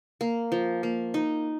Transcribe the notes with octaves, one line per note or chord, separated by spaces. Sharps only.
A#3
F3
A#3
D#4